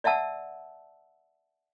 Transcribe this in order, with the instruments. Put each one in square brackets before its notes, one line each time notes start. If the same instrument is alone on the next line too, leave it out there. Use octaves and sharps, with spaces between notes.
[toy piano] D5 E5 F#5 A5 E6